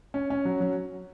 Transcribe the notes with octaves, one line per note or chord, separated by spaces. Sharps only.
C#4
C#4
F#3
F#3